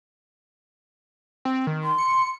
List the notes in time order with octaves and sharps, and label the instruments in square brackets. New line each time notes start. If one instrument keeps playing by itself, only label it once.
[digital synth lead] C4
D#3
[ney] C6
[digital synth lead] C#7